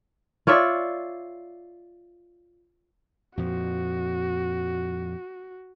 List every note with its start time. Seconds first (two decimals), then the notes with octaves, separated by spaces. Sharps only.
0.47 F4 C#5 D5 E5
3.37 F2 A#2 F3 F#4